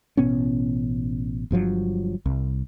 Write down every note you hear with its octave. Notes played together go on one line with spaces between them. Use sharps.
A1 B2 B3 C#4
G1 G2 F3 F#3
C2